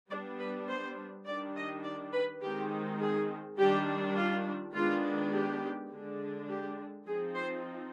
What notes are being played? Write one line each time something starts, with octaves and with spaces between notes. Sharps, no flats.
G3 B3 D4 D5
B4
C5
D#3 G3 D4 D5
D#5
D5
B4
D#3 G#3 C4 D#4 G4
G#4
D#3 G3 D4 G4
F4
D#3 G#3 B3 D4 F4
G4
D3 G#3 D4
G4
F3 C4 D#4 G#4
C5